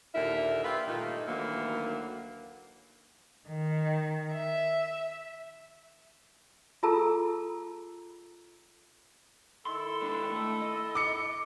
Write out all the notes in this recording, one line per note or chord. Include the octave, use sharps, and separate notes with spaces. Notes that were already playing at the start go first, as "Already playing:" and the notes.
D#2 A#2 D3 A#4 E5
F4 G4 B4 E5 F5
G2 A#2 D#3 A3 D#4 F4
D2 D#3 E3 F#3 A#3 F#5
D#3
E5
F4 G#4 A4 A5 A#5 E6
D#3 E4 A4 C6
G#2 D4
A3
D#5
D6 C#7